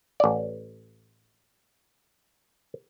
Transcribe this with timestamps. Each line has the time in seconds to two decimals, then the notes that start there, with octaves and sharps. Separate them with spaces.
0.20 A1 D5